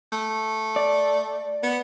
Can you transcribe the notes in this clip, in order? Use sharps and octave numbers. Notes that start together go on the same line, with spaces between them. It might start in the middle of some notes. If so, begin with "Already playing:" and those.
A3
D5
B3